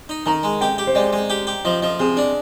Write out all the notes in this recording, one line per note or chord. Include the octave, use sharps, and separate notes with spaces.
D#4
D#3 A#5
G#3
G4 G5
G4
C5
G#3 D5
G#3
G4
G4
F3 D#5
F3 D#5
C3 G#4
D4